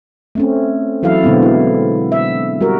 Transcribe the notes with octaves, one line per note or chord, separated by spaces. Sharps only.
A3 C4 C#4
E3 F#3 E4 A4 F5
B2 D3 G#3 B3 C4
E4
E5
G3 F#4 A#4